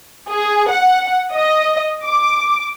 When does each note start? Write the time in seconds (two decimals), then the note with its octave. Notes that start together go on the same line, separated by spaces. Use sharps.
0.30 G#4
0.69 F#5
1.33 D#5
2.05 D6